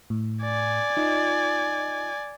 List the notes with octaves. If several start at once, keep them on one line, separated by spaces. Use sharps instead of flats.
A2
D5 G#5
D#4 F4 D#5